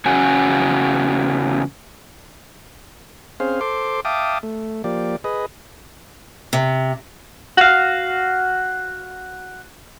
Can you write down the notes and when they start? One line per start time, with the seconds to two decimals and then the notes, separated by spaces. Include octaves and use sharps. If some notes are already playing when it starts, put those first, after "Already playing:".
0.06 E2 C#3 C#4 F#4 G#5
3.40 C4 C#4 G#4 C5 F5
3.61 A4 C5 C6 D6
4.05 E5 F5 G5 A5 D6 D#6
4.43 A3
4.84 F3 A#3 G4 D5
5.24 G#4 B4 D#5
6.53 C3
7.57 F#4 F5